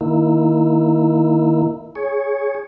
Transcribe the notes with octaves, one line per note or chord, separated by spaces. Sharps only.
D#3 A#3 E4
G#4 C#5